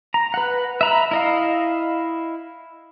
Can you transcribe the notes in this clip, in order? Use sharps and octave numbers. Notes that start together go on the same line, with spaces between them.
A#5
B4 F#5
E5 A#5 B5
E4 D#5 F5